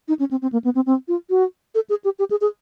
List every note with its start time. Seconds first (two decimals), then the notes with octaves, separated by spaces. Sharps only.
0.08 D#4
0.19 C#4
0.31 C4
0.42 C4
0.53 A#3
0.64 B3
0.75 C4
0.86 C4
1.08 F4
1.30 F#4
1.75 A4
1.90 G#4
2.04 G4
2.19 G4
2.31 G#4
2.41 G#4